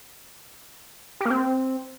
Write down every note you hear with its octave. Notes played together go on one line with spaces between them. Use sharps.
G4
A#3
C4